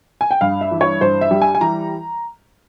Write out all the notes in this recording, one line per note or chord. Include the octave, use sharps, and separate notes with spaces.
G#5
G5
G2 F5
E5
E3
C#5
G2 C5
E5
G3
G#5
G#5
E3 A#5